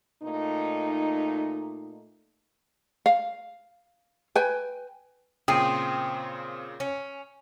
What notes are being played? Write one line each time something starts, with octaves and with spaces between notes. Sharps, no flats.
A#2 A3 D#4
F5
B4 G5 G#5
A#2 C#3 C4 G5 D#6 C7 D#7
C#4